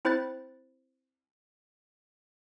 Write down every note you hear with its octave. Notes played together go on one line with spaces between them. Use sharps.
C4 E4 C5 B5 F#6 A6